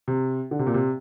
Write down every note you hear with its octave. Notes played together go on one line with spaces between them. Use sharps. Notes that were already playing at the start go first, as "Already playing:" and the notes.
C3
D3
C3
A#2
C3